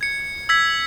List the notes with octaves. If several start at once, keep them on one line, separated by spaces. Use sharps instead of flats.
G#6 C#7
E6 G#6 B6